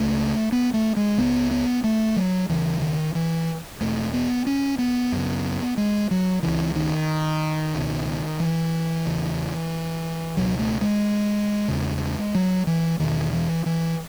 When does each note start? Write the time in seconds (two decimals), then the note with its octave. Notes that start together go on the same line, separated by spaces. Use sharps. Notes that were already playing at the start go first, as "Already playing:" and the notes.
Already playing: C#2 C#3 A3
0.52 B3
0.74 A3
0.96 G#3
1.18 C#2 C#3 B3
1.51 B3
1.84 A3
2.16 F#3
2.49 D#2 C#3 E3
2.82 D#3
3.15 E3
3.80 E2 B2 A3
4.13 B3
4.46 C#4
4.78 B3
5.12 F#2 C#3
5.77 G#3
6.11 F#3
6.43 C#2 C#3 E3
6.76 D#3
7.74 C#2 B2
8.40 E3
9.06 E2 C#3
10.37 C#2 B2 F#3
10.59 A3
10.81 G#3
11.68 E2 C#3
12.35 F#3
12.67 E3
12.99 E2 B2 D#3
13.33 E3
13.66 E3